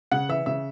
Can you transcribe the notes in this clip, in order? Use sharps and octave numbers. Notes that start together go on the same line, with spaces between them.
C#3 F#5
E3 E5
C#3 E5